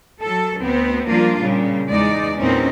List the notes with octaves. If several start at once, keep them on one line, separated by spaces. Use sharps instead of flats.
F#3 A4
D2 B3 C4
F3 G3 A#3 D4 F4
A#2 C#3 G3
E2 G#3 D#4 D5
E2 A#2 C4 C#4 D#4